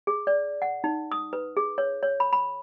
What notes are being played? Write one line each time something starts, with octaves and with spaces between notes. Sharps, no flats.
G#4
D5
F#5
D#4
D#6
B4
G#4
C#5
C#5
B5
B5